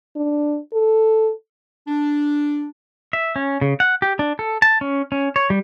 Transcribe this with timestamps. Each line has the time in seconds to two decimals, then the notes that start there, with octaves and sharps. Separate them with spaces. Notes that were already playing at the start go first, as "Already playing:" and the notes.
0.16 D4
0.73 A4
1.88 D4
3.13 E5
3.36 C#4
3.61 C#3
3.80 F#5
4.02 G4
4.19 D4
4.39 A4
4.62 A5
4.81 C#4
5.12 C#4
5.36 C#5
5.50 G3